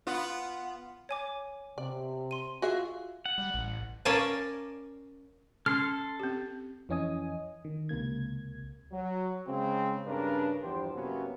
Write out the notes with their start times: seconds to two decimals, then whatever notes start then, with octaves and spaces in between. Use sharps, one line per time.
0.07 B3 F4
1.09 C#5 G#5 D6
1.78 C3 D5
2.31 C6 D#7
2.62 F4 F#4 G#4 E5
3.26 F#5
3.38 G3
3.54 A1
4.05 C#4 A#4 D5 F5 G#5 A5
5.66 C#4 A4 C6 F6
6.20 C4 G4
6.89 F2 E3 C#4 D#5 G#5 D#6
7.65 D#3
7.89 C#2 C3 A#3 G#6
8.92 F#3
9.48 C#3 G#3 C4
10.06 G2 C#3 D4 A#4 B4
10.62 E2 G2 F3 G4 C5
10.95 F#2 C3 F#3 A#3 B3 C#4